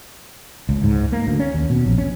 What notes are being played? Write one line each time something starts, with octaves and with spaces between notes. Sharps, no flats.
C#2
G#2
A#3
D2
C#4
D#2
B2
A#1
C#4